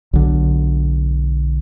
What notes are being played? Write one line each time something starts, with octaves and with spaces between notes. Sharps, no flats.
B1 D3